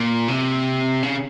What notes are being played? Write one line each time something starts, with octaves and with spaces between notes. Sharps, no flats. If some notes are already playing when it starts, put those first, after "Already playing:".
Already playing: A#2
C3
C#3